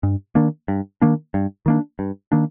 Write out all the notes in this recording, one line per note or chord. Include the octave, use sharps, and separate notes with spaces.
G2
D#3 A#3 D4
G2
D#3 A#3 D4
G2
D#3 A#3 D4
G2
D#3 A#3 D4